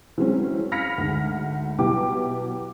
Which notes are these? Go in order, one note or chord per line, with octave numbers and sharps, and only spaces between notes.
E3 F#3 G#3 C4 C#4
F5 B5 F6 A#6 B6 C#7
D2 G#2
B2 F#3 E4 G4 D6